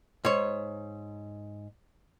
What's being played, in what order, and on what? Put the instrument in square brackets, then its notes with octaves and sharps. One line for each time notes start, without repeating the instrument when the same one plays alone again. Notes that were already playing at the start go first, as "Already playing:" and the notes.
[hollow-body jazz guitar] G#2 C#5